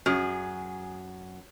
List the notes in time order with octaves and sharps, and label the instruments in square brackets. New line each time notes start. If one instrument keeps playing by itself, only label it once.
[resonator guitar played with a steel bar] F#2 [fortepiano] F#3 [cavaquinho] G#4